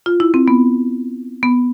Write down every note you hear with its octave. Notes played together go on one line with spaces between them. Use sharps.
F4
E4
C4
B3
B3